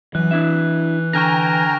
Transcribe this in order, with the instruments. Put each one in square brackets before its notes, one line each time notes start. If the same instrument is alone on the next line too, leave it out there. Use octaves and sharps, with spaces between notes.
[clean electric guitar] F#2 [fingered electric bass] E3 [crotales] F#6
[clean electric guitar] D4 E4 E5
[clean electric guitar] D3 [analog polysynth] G5 G#5 A#5 [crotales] C#6 F6 A#6